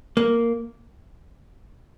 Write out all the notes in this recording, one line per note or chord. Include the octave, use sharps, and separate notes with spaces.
A#3